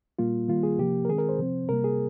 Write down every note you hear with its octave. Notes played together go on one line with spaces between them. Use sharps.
A#2 G3 A#3 F4
D#3 G3 A#3 F4
G#4
C3 F3 A#3 G4
A#4
D#3 G#3 C4 G#4
A#4
C5
C3 F3 C4
C3 G3 A#3 A#4
G#4